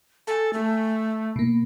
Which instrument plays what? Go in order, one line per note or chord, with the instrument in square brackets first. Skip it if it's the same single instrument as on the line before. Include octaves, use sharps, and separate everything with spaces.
[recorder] A4 [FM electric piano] G#5 A5
[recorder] A3
[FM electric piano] B2 A#3